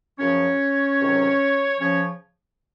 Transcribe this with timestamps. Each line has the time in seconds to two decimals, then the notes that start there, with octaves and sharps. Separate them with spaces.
0.19 F#2 C#3 F3 C#4 C#5
0.99 C#2 C3 D#3 F#3
1.79 C#3 F3 C#4 C#5